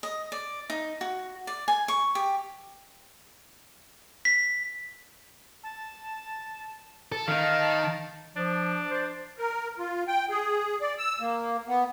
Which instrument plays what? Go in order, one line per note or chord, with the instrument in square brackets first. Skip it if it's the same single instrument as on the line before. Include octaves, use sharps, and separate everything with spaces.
[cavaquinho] D#5
D5
D#4
F#4
D5
G#5
C#6
G4
[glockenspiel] B6
[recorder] A5
[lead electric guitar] A4 [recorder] A5
[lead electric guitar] D#3 D#4 [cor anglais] F5
[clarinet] F3 [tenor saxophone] D4
[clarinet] C5
[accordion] A#4
F4
G5
G#4
D5
E6
A#3
B3